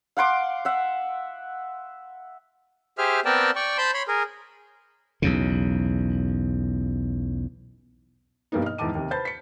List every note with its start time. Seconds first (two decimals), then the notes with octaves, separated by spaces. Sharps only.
0.17 F5 F#5 C6 D6
0.65 E5 F#5
2.98 G4 G#4 C5 E5 F6
3.25 B3 C4 A#4 D5 G5 A5
3.56 D5 G5 C#6
3.78 C5 A5 B5 C6 G6
3.94 C#5 B5 C6
4.08 G#4 A#4
5.22 B1 E2 C#3
8.52 G2 B2 A#3 B3 D#4
8.64 D#5 F6
8.78 E2 G#2 D#3 A5 D6 D#7
8.95 D#2 C3
9.11 B4 C5 A5 B5 G6 A6
9.25 B6 C#7